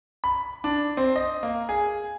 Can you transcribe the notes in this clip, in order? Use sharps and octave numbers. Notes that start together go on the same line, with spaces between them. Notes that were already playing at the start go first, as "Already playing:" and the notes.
B5
D4
C4
D#5
A#3
G#4